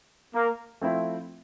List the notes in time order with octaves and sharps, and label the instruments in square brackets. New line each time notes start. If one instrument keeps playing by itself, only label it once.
[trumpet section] A#3
[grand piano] F3 A3 C4 E4